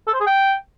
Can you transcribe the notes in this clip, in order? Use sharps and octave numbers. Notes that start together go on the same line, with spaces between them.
A4
C5
G#4
G5